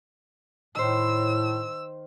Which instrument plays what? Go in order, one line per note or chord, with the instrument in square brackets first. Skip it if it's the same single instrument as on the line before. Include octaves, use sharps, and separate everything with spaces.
[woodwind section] A2 [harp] D#3 C5 [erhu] E6